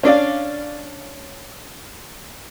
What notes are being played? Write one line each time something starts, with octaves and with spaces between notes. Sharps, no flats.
C#4 D4 D5 F5